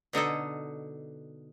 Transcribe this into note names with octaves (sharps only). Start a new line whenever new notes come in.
B2 D3 D#4 A4